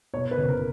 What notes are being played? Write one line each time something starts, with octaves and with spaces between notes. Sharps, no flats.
B2 C#5
B4
F#1
A#4